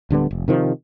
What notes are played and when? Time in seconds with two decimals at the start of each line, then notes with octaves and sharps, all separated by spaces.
0.10 D1 D3 G3 B3
0.31 F1
0.48 C3 D#3 F3